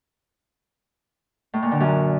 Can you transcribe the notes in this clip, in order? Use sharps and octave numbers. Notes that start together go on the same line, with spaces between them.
A2
A#2
D3
F#2